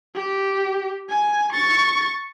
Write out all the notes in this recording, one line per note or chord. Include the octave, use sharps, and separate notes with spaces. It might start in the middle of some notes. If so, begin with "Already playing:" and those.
G4
G#5
C#6 A6